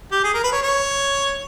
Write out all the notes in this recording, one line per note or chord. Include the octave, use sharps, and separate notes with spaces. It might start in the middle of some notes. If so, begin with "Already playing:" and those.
G4
G#4
A#4
B4
C#5
C#5